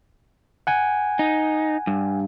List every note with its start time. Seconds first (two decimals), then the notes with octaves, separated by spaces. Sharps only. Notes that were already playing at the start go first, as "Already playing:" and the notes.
0.67 F#5 G#5
1.19 D#4
1.87 G2